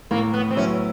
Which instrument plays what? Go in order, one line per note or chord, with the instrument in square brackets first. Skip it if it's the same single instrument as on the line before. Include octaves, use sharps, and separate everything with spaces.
[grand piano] A2 [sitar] A#3
[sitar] B3
C4
[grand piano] F#3 B3 E4 [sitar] C#4